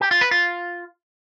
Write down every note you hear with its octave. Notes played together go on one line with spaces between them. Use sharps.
G4
F4
B4
F4